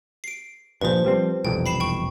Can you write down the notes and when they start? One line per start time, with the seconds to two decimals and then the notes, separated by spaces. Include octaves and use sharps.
0.24 C7 D7
0.81 G2 A#2 F3 B4 C5
1.04 F3 G3 C4
1.45 E1 C2 F2 G5
1.66 B5 C7 E7
1.80 G5 C#6